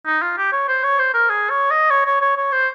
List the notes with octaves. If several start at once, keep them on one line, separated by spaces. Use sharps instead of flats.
D#4
F4
G4
C#5
C5
C#5
C5
A#4
G#4
C#5
D#5
C#5
C#5
C#5
C#5
C5